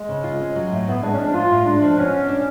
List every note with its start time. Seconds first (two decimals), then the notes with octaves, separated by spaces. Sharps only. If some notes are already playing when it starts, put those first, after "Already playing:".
Already playing: G#3
0.09 C#3
0.24 F4
0.40 C#4
0.56 F#3
0.71 A2 A3
0.87 A2 B3
1.02 G#3 D4
1.13 C#4
1.18 F3 D4
1.34 A2 F4
1.50 A2
1.66 G#3 D4
1.82 F3
1.97 B2 C#4
2.12 F4
2.28 C#4 D4